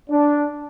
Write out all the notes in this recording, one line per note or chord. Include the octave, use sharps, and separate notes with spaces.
D4